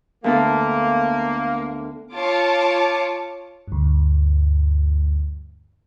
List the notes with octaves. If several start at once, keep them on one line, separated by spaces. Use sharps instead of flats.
D2 A#3 B3 A4
F4 C#5 A5 D6 C#7
D2 G2